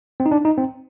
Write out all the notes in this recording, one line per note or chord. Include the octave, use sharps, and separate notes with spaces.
C4
D#4
D4
D#4
C4